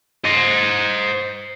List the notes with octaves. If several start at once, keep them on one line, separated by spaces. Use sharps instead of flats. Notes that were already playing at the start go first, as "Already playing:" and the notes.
C5 D#5